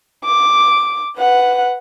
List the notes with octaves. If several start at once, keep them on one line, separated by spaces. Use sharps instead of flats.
D6
B4 F#5